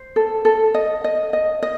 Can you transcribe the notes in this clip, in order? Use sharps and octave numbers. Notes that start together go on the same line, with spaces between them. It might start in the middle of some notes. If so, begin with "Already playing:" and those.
Already playing: C5
A4
A4
D#5
D#5
D#5
D#5